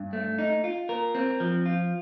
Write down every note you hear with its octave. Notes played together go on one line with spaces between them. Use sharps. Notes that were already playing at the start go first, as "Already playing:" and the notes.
Already playing: G2
A3
D#4
F4
A#4
C4
F3
F4